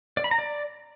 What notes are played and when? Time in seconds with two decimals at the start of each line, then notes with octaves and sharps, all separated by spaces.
0.17 D5
0.24 B5
0.31 A#5
0.38 D5